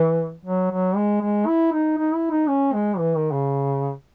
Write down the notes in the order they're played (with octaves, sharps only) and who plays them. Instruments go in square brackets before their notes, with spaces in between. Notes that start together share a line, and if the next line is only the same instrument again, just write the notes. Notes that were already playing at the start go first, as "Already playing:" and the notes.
Already playing: [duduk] E3
F#3
F#3
G#3
G#3
E4
D#4
D#4
E4
D#4
C#4
G#3
E3
D#3
C#3